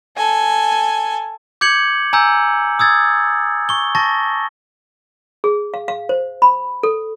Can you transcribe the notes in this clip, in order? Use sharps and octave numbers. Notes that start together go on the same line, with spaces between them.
A4 G#5
D6 G6 G#6 C#7 F#7
G#5 A#5 E6 G6
D#6 E6 G#6 A6
C#6 G7
A5 C#6 A6 A#6
G#4
F5
F5
C5
B5
A4